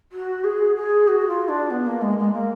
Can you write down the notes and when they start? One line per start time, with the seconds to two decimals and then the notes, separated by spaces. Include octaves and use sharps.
0.12 F#4
0.44 G#4
0.75 G#4
1.07 F#4
1.27 F4
1.48 D4
1.70 B3
1.86 A#3
2.01 G#3
2.17 G#3
2.32 A#3